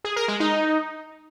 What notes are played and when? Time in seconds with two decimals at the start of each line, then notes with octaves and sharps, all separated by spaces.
0.04 G#4
0.16 A#4
0.28 G#3
0.40 D#4